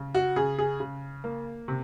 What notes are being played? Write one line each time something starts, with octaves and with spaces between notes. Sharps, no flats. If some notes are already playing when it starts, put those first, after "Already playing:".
Already playing: C#3
F#4
C#3 G#4
G#4
C#3
A#3
C3